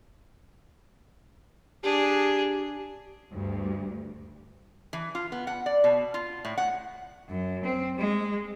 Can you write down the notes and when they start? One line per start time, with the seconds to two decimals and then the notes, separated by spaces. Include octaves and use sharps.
1.83 D4 G4 G#4
3.33 D2 G2
4.93 E3
5.15 F4
5.32 B3
5.47 F#5
5.66 D5
5.84 B2
6.14 F4
6.45 A2
6.58 F#5
7.29 F#2
7.64 C4
7.98 G#3